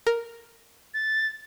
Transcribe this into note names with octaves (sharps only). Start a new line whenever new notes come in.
A#4
A6